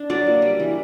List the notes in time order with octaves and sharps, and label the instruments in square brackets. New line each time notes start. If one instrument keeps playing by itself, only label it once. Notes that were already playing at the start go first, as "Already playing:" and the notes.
Already playing: [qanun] D4
F#3 D5
A#3
G3
E3